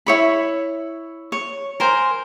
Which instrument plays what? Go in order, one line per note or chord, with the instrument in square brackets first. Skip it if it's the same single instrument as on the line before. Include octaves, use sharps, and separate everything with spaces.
[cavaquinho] E4 C#5 B5
C#5
A#4 C5 G#5